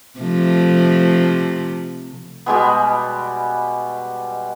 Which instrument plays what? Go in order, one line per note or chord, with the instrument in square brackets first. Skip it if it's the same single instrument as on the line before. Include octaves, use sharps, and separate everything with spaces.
[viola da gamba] C3 F3 A3
[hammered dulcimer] B2 G3 G#3 B3